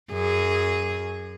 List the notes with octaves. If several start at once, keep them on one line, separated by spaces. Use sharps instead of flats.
F#2 G#4